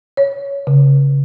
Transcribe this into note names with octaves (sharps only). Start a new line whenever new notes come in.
C#5
C#3